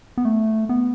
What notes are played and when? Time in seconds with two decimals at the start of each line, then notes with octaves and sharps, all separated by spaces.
0.18 B3
0.25 A3
0.69 B3